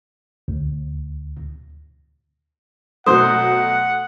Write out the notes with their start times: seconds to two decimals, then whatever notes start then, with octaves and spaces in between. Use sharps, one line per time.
0.48 D2
3.06 B2 F#3 A3 C5 F#5 D#6